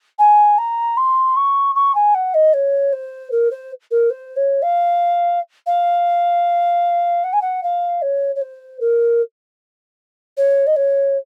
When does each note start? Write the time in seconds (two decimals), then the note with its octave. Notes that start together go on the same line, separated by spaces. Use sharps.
0.19 G#5
0.58 A#5
0.97 C6
1.36 C#6
1.75 C#6
1.95 G#5
2.15 F#5
2.34 D#5
2.53 C#5
2.93 C5
3.31 A#4
3.51 C5
3.91 A#4
4.10 C5
4.36 C#5
4.62 F5
5.66 F5
7.24 F#5
7.33 G#5
7.41 F#5
7.63 F5
8.02 C#5
8.35 C#5
8.41 C5
8.80 A#4
10.37 C#5
10.67 D#5
10.76 C#5